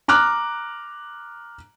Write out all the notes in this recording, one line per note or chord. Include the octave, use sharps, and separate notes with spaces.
A#5 D6 F6 F#6